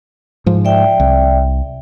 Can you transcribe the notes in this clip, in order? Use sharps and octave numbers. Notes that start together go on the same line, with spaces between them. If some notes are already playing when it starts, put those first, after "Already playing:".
G#2 F3
D5 E5 G5
C2